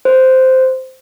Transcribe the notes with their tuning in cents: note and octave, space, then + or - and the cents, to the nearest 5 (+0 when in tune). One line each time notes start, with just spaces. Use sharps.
C5 -10